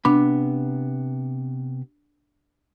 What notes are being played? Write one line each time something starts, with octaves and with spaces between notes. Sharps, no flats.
C3 B3 D4 B5